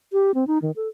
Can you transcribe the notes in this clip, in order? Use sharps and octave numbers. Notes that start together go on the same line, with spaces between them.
G4
C4
D#4
D#3
A4